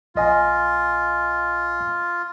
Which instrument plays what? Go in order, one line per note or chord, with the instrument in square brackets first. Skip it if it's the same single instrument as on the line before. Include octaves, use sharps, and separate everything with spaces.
[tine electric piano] A#1 D#5 G#5 [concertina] F4